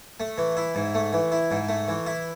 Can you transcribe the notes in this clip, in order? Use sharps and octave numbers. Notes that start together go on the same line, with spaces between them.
A3
E3
E4
G#2
A3
E3
E4
G#2
A3
E3
E4